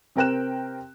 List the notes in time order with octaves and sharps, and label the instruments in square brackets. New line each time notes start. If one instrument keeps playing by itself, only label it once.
[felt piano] C3 C4 A#4 G5 F#6 E7